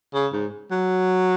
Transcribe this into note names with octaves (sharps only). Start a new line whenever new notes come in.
C#3
G#2
F#3